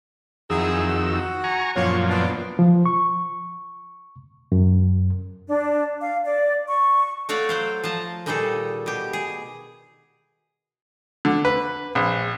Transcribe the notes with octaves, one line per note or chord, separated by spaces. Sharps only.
F2 D#3 F#3 E4 G#4 E6
F#4
G#5 A#5 C#6
F#2 A#2 F3 D4 F4 C#5
E3 B3 D4
F3
C#6
F#2
D4
F5
D5
C#6
A3 F#4 C#5 D5 F5
F#3 C5 F5
F3 F5 A5 A#5
A#2 D#3 G3 D#4 G#4 A4
B2 G4
G#4
D3
B4
A#1